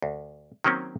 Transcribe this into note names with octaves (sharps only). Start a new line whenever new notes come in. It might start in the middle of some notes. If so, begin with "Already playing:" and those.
D2
D#3 F#3 A#3 C4 C#4